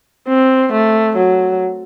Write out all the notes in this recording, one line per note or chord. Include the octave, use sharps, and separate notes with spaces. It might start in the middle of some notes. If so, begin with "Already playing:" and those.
C4
A3
F#3